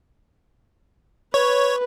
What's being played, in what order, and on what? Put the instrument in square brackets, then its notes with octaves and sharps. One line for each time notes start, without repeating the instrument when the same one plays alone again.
[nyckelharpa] B4 [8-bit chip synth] C#5